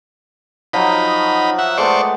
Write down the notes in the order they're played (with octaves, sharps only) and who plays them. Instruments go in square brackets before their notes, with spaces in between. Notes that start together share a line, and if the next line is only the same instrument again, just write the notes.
[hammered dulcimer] F3 F#3 [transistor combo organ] D#4 B5
[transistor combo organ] E5 F#5
[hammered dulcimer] G#3 A3 B3 [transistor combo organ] C5 D5 C#6